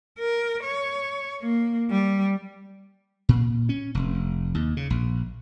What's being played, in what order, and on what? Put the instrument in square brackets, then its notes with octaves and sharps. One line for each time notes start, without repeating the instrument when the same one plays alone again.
[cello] A#4
C#5
A#3
G3
[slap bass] A#2
C#4
F1
D#2
C#3
A#1